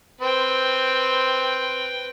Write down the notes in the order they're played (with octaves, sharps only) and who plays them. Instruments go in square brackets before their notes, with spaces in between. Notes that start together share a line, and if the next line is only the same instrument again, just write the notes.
[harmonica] C4 [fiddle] B4 G5